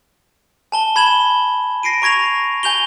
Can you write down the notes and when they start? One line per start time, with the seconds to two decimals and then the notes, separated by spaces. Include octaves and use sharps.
0.72 G#5 A5 G7
0.96 B5 G#6 E7 F#7 G7
1.83 A#6 C7 D7 D#7
2.02 A#5 C#6 G#6 A#6 F7
2.63 G#5 G6 F7 G7